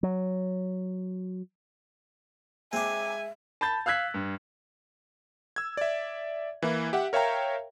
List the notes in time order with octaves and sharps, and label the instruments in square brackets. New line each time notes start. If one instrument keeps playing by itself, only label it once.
[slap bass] F#3
[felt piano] G#3 [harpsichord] C4 D4 [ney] E5 [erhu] G#5
[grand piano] A5 B5 G6 A6
F5 E6 F#6 G#6 B6
G2
[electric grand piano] E6 G#6
D5 E5
E3 A#3 E4
G4 E5 F#5
A#4 C#5 E5 F5 G5 A#5